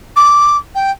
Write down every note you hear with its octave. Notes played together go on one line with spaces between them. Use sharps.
D6
G5